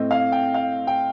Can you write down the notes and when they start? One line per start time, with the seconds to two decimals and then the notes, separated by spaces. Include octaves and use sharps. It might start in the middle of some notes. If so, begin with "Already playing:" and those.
Already playing: A2 A3 C4 D#5
0.11 F5
0.32 G5
0.54 F5
0.87 G5